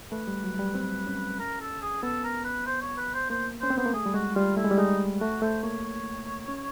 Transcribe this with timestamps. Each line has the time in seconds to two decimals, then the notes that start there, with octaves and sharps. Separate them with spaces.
0.12 A3 B4
0.28 G3
0.44 F#3
0.59 G3
0.75 C4
1.07 C#4
1.39 A#4
1.61 A4
1.82 G#4
2.02 B3 A4
2.24 A#4
2.44 B4
2.66 C5
2.82 C#5
2.97 B4
3.14 C5
3.30 A#3 C5
3.61 C#4 C5
3.70 C4
3.78 B3 C5
3.86 A#3
3.93 A3 G#4
4.06 G3
4.14 G#3 F#4
4.35 G3 F4
4.57 A3 E4
4.64 G#3
4.71 G3
4.78 G#3 D#4
5.20 A3 F#4
5.42 A3 C5
5.63 A#3 C#5
5.85 C#5
6.48 C#4